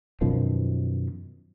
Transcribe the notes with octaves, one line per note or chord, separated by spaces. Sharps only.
F#2 B2 D#3 F3